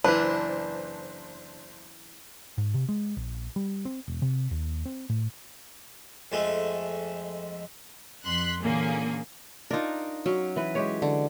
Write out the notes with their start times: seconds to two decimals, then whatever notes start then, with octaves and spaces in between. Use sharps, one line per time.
0.04 F#1 E3 D4 B4 C5 A5
2.58 G#2
2.74 C3
2.89 G#3
3.17 A#1
3.56 G3
3.85 C4
4.08 E1
4.22 C3
4.51 D#2
4.86 C4
5.09 A2
6.32 F2 G#3 A3
8.25 F2 C6 F#6 B6
8.60 A#2 D3 E3 A#3 C#4 G#4
9.71 D4 D#4 F4 A#4
10.26 F#3 C#4
10.56 E3 B4
10.75 G#3 G4 C#5
11.02 D3